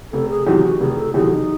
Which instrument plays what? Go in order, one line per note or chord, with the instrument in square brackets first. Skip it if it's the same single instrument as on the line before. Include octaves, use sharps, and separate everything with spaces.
[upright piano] F1 [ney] A4
[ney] G#4
[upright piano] E2 C3 D#3 F#3 [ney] G4
[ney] F#4
[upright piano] F1 [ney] G#4
[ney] A4
[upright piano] E2 C3 D#3 F#3 [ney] G#4
[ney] D#4